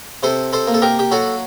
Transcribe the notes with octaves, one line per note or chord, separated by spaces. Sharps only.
C3 A4 C5
A4 C5
A#3
A4
G4 A#4
G4
F#3 F#4 A4